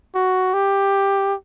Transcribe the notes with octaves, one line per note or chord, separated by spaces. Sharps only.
F#4
G4